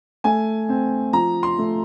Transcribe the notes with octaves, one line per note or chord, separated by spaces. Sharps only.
A3 G#5
C4
F3 A#5
C6
A3